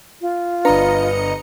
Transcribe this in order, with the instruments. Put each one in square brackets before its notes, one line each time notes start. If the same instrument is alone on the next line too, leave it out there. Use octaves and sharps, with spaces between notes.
[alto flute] F4
[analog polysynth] G1 D#5 C#7 [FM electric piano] D4 A#5 [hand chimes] B4